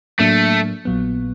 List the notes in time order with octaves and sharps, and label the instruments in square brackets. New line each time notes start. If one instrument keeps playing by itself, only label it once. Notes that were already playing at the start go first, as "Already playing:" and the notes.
[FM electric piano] A2 F#3 A#3 D4 [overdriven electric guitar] A3
[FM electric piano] A#1 A#2 F#3 B3